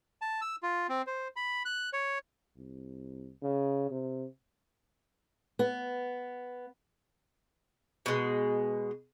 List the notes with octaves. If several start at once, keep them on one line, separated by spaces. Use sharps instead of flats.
A5
E6
F4
C4
C5
B5
F#6
C#5
C2
C#3
C3
B3
B2 G#3